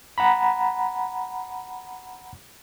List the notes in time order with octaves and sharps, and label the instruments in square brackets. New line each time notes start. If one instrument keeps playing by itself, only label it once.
[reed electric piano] F#5 A#5 B5